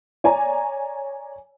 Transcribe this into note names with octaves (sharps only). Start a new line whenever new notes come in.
C#5 D5 G#5 A#5